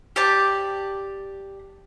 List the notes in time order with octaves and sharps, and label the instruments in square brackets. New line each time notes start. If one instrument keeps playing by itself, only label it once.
[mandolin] G4 D5 A5